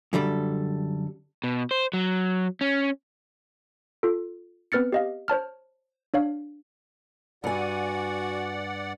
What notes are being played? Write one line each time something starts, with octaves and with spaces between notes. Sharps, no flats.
F#2 D3 G3 A4
B2
C5
F#3
C#4
F4 A4
B3 C4 B4 F6 A6 C#7
G4 D#5 F5
C5 C#5 A5 F6
D4 C#5 F5
G2 F#4 D5 F#5 G#5